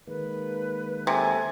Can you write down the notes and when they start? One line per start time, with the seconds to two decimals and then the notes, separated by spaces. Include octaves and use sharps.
0.07 D#3 G#3 A#3 B4
1.07 C3 A4 G#5